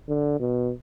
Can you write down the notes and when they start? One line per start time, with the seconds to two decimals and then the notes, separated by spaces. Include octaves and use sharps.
0.08 D3
0.39 B2